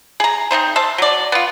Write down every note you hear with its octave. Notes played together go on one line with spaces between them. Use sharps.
G#4 A#5
C4 D4 D#4 C5
C5 E5 A5
F#3 D5
B3 F4